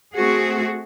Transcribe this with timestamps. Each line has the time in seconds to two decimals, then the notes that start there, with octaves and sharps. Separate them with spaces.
0.14 A3 C4 F#4 G#4